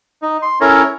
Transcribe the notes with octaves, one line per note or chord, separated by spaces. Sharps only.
D#4
C6
C#4 E4 A4 A#4 C#5